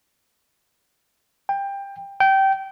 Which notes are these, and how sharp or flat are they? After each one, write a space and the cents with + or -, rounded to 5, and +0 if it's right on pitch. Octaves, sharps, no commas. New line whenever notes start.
G5 +20
G5 -20